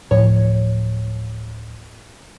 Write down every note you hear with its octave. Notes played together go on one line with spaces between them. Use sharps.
D1 A2 F3 C#5